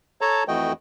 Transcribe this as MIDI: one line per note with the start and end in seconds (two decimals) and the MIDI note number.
0.21 0.44 69
0.21 0.44 73
0.21 0.44 81
0.21 0.44 82
0.48 0.73 41
0.48 0.73 52
0.48 0.73 57
0.48 0.73 66
0.48 0.73 75
0.48 0.73 79